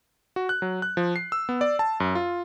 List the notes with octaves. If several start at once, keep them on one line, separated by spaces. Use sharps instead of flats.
F#4
F#6
F#3
F#6
F3
C7
E6
B3
D5
A5
F#2
F4